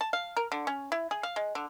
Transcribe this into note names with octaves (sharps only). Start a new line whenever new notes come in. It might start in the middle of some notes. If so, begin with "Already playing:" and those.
A5
F5
A#4
D3
C#4
E4
G#4
F5
G#3
D3